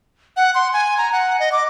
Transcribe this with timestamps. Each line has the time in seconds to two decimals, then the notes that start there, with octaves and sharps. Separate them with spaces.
0.37 F#5
0.55 C6
0.73 G#5
0.98 A#5
1.12 F#5
1.40 D#5
1.52 D6